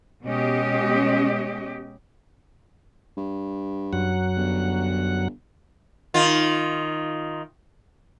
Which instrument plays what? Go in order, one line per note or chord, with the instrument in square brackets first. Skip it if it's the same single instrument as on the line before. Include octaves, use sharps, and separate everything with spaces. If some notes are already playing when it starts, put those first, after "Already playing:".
[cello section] B2 G#3 C#4 G4 D#5
[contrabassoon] G2
[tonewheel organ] F#2 F#3 F#5
[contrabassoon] G1
[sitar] D#3 F4